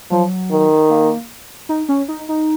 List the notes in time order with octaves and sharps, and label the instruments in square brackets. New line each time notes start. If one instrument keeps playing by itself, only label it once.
[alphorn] F3 [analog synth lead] F#3
[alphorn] D#3
[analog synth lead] A#3
D#4
C#4
D#4
D#4